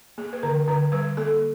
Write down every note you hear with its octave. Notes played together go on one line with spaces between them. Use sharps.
A#3 G#4
B4
D3 A#4
D3 B4
G3 B4
A#3 A4